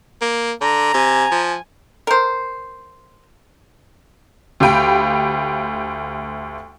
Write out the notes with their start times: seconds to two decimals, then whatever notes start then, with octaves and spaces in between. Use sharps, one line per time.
0.22 A#3
0.61 D3 A#5
0.94 C3 G#5
1.32 F3
2.07 A#4 C5
4.60 D2 G4 F5 G5 B5 D7